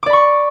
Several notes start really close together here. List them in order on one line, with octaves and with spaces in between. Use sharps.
D6 D5 B5 C#6